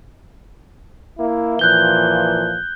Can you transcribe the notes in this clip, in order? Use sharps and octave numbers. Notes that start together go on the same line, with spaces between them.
A#3 E4
A#2 E3 F3 F#6 G6 G7